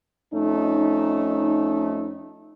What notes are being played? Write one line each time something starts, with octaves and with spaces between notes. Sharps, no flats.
F2 A3 C#4 D#4